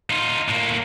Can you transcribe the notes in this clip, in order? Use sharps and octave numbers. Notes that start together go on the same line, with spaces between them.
D#4 F4
A2 A#3